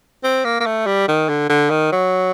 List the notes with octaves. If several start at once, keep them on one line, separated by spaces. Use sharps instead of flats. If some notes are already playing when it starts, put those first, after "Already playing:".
C4
A#3
A#3
A3
G3
D#3
D3
D3
D#3
F#3